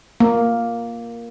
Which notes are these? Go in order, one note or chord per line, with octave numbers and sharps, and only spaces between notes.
A#3